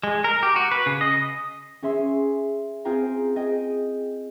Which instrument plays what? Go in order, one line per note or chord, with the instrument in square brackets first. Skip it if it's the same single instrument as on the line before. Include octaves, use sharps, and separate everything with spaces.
[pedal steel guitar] G#3
A#4
G4
F#4
B4
C#3
D#5
[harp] C#4 G#4 E5 C6
C4 F4 G#4 C5 G5 A#5
G#4 D#5 G5